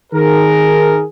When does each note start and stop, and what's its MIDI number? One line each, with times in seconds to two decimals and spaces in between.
0.13 1.02 51
0.13 1.02 68
0.13 1.02 70